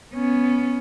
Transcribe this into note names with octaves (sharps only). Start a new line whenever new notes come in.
B3 C#4